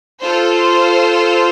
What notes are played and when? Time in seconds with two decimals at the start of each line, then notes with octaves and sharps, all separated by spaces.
0.24 F4 A4 C5